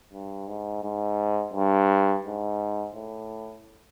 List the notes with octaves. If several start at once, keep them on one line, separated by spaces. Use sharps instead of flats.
G2
G#2
G#2
G2
G#2
A2